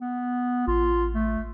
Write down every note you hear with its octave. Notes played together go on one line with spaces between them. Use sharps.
B3
A1 F4
A3